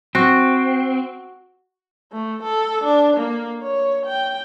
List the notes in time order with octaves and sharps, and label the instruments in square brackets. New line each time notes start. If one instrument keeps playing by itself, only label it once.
[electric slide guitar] C4 [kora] F#4
[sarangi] A3
A4
D4
A#3
C#5
G5